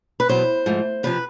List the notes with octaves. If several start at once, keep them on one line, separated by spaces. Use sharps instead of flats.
B4
E2 B2 F#3 B3 C5
G#2 F3 A3
F2 C3 F3 B4